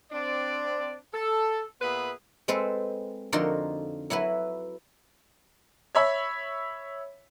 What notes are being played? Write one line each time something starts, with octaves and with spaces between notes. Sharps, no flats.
C4 D4 D5
A4
A#2 B3 G#4 B4 E5 B5
G#3 C4 A4 B4 C5
F2 D3 D#4 F4 F#4 A#4
F#3 E4 F#4 B4
C#5 E5 B5